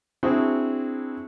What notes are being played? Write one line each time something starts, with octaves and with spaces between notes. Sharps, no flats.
C4 D4 E4 F#4 G#4